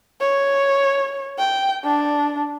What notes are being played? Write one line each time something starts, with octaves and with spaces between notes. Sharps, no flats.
C#5
G5
D4